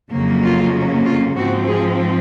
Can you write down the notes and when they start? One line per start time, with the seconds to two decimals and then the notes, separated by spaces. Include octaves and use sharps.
0.12 F2 C#3 F#3 A#3 C#4
0.43 F4
1.05 F4
1.36 G#2 F3 C4 F#4
1.67 G#3 G#4